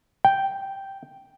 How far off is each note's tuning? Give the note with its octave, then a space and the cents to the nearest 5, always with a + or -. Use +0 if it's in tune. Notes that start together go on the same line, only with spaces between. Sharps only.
G5 -5